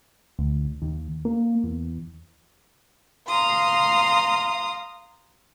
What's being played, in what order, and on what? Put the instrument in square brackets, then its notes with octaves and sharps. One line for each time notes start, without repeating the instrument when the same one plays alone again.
[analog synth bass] D2
D#2
A#3
E2
[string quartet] F5 A#5 C6 D#6